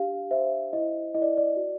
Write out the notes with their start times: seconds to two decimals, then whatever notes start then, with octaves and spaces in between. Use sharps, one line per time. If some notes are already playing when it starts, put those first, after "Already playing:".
Already playing: D4 G4 F5
0.31 C5 E5
0.73 E4 D#5
1.15 E4 D#5
1.22 D5
1.37 D5
1.56 F#4